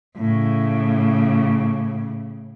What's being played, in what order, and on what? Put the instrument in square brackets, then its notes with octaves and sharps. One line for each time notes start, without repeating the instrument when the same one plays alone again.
[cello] A2 C#3